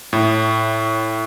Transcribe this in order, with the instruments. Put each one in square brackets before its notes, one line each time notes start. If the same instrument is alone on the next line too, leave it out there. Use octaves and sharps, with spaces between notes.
[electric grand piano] A2